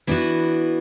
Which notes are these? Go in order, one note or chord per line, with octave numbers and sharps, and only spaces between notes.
E3 B3 D4 F#4